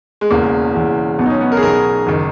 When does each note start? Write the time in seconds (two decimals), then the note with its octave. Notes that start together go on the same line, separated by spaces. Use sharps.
0.21 G#3
0.30 E1 E2 C#3 A#3
0.74 E1 E2 C#3
1.19 B1 B2 B3
1.26 D#4
1.30 C#4
1.41 B3
1.52 A#4
1.57 G#4
1.63 B1 B2 A#4
2.07 F#1 D#3